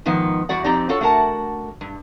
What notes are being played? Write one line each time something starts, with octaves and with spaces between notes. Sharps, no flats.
G#2 D#3 F3 B3
E2 G3 F#4 D5 F#5
F2 C4 D#4 G4 D5 A#5
F4 F#4 A4 C#5
A3 D4 F#4 A#4 F#5 A5
G2